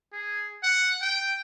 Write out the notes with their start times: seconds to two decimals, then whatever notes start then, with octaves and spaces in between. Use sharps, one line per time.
0.13 G#4
0.63 F#5
1.02 G5